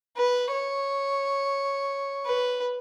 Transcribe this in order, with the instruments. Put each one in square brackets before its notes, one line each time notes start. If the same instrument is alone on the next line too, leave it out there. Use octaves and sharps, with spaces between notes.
[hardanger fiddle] B4
C#5
B4